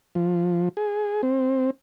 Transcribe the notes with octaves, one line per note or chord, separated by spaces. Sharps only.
F3
G#4
C4